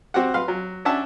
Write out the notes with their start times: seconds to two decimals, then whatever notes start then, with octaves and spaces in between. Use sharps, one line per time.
0.14 C4 F#4 G4 F#5
0.34 B4 F5 C6
0.48 F#3
0.85 C#4 D4 E5 F#5 A5